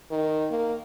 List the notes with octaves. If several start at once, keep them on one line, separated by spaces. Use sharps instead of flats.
D#3
A#3